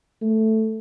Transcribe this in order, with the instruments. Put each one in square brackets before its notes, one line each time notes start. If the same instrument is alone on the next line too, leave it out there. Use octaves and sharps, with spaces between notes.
[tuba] A3